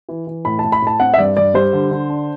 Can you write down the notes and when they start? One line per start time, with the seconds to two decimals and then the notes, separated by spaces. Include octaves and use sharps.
0.09 E3
0.27 E3
0.45 A2 B5
0.59 A5
0.64 A2
0.72 B5
0.82 A2 A5
1.00 C4 F#5
1.14 E5
1.18 G2 D5
1.36 G2 D5
1.54 G3 C5
1.73 D3
1.91 D3
2.10 D4